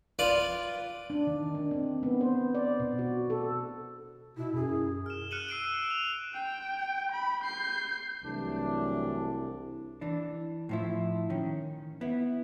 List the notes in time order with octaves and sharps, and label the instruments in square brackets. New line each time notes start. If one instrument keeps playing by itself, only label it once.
[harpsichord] F4 B4 D5
[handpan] D4
D#3
D4
C4
B3
C5
D5
B2
F#4
A4
[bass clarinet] B2 [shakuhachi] E4
[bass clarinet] F#2 [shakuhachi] G#4
[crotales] F6 E7
F6 F#6 C#7 D#7 E7 F#7
E6 C7 D7 D#7
F7
[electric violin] G5
B5
G6 C7
[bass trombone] C2 [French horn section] E3 F#3 A3 [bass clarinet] D4
[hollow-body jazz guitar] E3 D4
A2 F3 E4
D#3 C#4
B3 E4